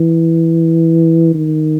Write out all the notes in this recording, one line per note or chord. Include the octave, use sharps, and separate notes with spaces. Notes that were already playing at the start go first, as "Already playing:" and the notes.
Already playing: E3
D#3